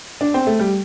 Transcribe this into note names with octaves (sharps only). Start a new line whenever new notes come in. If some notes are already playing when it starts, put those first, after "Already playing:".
D4
C4
A3
G3